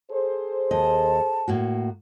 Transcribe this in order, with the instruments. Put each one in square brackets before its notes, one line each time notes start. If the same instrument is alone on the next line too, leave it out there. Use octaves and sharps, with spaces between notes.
[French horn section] G#4 A4 C5
[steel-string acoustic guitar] D#2 D#5 [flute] A5
[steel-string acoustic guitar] A2 A#3 F#4